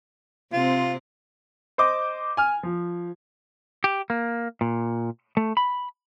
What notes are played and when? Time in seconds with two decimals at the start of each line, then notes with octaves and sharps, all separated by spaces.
0.53 C3 C4 F4
1.78 C5 D#5 D6
2.37 G#5 F6
2.63 F3
3.84 G4
4.10 A#3
4.61 A#2
5.37 A3
5.57 B5